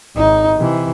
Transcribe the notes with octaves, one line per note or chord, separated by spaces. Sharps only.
G#1 D#4
C3 E3